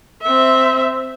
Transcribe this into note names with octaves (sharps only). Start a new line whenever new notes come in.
C4 E5